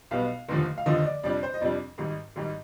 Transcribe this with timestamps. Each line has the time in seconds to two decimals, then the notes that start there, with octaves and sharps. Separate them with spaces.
0.11 B1 B2 G3 B3 F5
0.49 F1 D#2 D3 F3
0.78 F5
0.86 F1 D#2 D3 F3 D#5
1.06 D5
1.24 F2 C3 G3 D4 D5
1.43 C5
1.54 D#5
1.61 F2 C3 G3 D4 D5
1.98 G#1 G#2 G3
2.36 G#1 G#2 G3